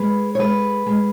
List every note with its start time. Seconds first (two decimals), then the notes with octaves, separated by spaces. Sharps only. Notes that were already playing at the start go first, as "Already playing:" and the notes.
Already playing: G#3 B4
0.35 C#5
0.39 G#3 B4
0.86 G#3